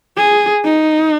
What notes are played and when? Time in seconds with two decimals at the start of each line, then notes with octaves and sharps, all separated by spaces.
0.17 G#4
0.64 D#4